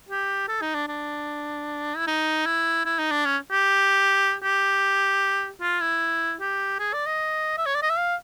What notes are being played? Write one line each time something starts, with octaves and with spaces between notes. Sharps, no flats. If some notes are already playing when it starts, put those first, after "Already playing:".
G4
A4
D#4
D4
D4
E4
D#4
E4
E4
D#4
D4
C#4
G4
G4
F4
E4
G4
G#4
D5
D#5
E5
C#5
D5
D#5
E5
F5